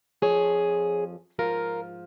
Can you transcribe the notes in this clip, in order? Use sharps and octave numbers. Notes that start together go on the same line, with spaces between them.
F2 F3 G#4 C#5
G#2 F3 F4 A#4